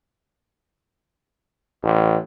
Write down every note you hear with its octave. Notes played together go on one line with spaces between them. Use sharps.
A1